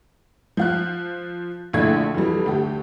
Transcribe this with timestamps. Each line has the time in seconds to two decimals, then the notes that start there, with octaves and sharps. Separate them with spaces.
0.57 F3 F5 F#6
1.73 A#1 A2 D3 A3 F4 G#6
2.15 F2 E3 F#3 G3
2.46 D2 G4